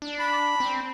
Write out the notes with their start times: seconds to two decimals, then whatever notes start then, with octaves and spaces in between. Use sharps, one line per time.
0.02 D4
0.19 B5
0.60 C4